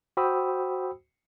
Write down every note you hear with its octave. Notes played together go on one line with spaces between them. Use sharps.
F#4 C5 G5 B5 D#6 E6